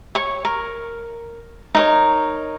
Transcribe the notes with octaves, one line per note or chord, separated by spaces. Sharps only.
C#5 C#6
A#4
D#4 A#4 C#5